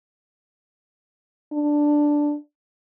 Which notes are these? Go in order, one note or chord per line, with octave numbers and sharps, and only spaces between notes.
D4